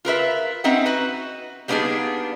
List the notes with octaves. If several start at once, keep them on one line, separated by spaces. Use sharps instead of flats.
F4 A#4 B4 E5
C4 C#4 D#4 E5 F#5
F#4 B4
G3 A#3 B3 D4 D#4 G#4